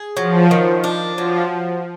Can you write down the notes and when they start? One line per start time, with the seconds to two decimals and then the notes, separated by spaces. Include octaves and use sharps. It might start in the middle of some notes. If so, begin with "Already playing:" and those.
Already playing: G#4
0.17 F3 F#3
0.51 D#3
0.84 D4
1.18 F3 F#3